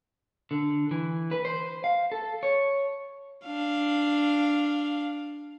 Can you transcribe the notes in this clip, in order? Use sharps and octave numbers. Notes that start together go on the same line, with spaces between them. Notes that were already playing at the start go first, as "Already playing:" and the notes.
D3
E3
B4
C5
F5
A4
C#5
D4 F5